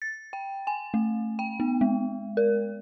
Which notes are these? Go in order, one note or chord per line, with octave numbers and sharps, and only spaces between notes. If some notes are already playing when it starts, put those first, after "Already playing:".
A6
G5
G#5
A3
G5
B3
G#3
A#4